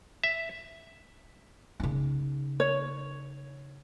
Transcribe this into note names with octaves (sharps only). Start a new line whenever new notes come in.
E5
C#3 D#4
C#5